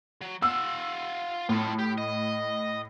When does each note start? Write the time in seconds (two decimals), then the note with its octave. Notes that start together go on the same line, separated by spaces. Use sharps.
0.21 F#3
0.42 F4 F#5 E6
1.49 A2 F4 A4
1.79 G4
1.98 D#5